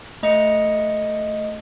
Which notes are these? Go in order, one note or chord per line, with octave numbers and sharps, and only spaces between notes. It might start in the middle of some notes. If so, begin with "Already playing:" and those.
A3 D#5 D#6 C#7